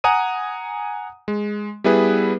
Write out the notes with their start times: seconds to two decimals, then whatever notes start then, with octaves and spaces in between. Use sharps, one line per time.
0.04 F#5 G#5 A#5 D#6 D#7
1.28 G#3
1.84 G3 B3 E4 G#4 B4